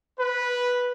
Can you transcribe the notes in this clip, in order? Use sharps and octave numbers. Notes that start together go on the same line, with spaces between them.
B4